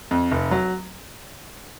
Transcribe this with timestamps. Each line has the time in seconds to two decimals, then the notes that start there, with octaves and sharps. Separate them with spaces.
0.11 F2
0.31 F1
0.51 F#3